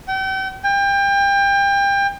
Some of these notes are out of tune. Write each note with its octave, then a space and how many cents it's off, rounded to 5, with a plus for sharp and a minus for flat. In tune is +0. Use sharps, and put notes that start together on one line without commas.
G5 -40
G5 +30